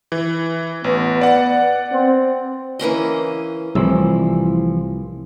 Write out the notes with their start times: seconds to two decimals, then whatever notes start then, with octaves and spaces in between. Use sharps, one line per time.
0.12 E3
0.84 A1 B3
1.21 D5 F#5
1.92 C4
2.79 E3 A#3 C#4 D#5
3.75 C2 A2 E3 F3 E6